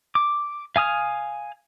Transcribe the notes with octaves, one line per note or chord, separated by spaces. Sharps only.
D6
F5 G#5 D#6 F6